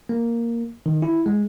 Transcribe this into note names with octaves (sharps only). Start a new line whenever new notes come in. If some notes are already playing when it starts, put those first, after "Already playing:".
A#3
D#3
E4
G#3